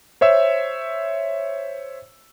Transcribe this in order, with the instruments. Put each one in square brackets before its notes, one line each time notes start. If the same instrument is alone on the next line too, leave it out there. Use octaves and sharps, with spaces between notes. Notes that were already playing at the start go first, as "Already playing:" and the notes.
[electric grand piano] C5 C#5 E5 E6